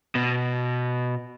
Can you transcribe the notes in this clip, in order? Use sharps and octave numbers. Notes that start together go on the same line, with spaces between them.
B2